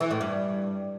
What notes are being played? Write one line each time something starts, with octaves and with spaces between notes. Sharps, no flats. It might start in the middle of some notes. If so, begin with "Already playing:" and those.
E3
A2
G2